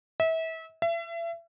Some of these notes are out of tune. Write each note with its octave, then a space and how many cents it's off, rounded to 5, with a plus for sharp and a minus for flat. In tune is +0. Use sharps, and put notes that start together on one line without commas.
E5 -30
E5 +35